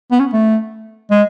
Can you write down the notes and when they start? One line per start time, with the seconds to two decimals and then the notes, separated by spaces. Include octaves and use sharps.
0.12 B3
0.20 C#4
0.33 A3
1.11 G#3